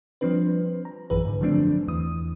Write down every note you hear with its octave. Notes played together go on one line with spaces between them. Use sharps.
F3 G3 C4 D4 B4
A#5
A#1 F#2 E3 G#4 B4
G#2 D3
D3 F3 F#3 A3 C4 D4
E2 E3 D#6